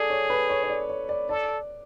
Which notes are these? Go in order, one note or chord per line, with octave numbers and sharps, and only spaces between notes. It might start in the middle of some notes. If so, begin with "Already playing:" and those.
Already playing: G#4 A4 D5
C#5
B4
C#5
C#5
D5
C#5
D5
A4 D5